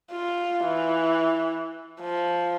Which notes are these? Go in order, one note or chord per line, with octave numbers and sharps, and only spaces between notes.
F4
E3
F3